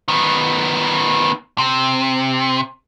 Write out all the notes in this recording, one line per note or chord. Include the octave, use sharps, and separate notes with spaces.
D#3 B3
C3